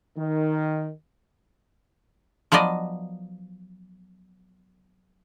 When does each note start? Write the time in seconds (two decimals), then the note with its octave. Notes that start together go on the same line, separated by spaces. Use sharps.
0.17 D#3
2.52 F3 F#3 B3 D5 D#5